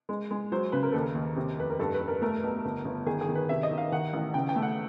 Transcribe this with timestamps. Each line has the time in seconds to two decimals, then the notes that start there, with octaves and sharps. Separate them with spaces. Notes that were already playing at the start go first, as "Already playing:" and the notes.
0.09 G#3
0.31 G#3
0.52 F#3 C5
0.72 C#3 B4
0.83 A#4
0.92 D#2 A4
1.01 A#4
1.15 D#2
1.36 C3
1.57 F1 B4
1.70 A#4
1.79 G2 A4
1.94 B4
2.01 G2
2.08 A#4
2.21 A3 A#4
2.43 B1
2.65 G1
2.85 G1
3.06 D#3 G#4
3.21 G#4
3.29 D#3
3.35 B4
3.49 C3 E5
3.63 D#5
3.71 D#3
3.78 F5
3.92 D#3 F#5
4.13 A1
4.34 C#3 G5
4.49 G5
4.56 A3
4.62 F#5